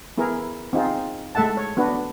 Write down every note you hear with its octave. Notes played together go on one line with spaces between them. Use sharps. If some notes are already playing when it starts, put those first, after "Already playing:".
B3 E4 G#4 A#4
C4 D#4 F4 G#4
G#3 A3 A4 E5 F#5 A5
C#5
B3 D4 F#4 B4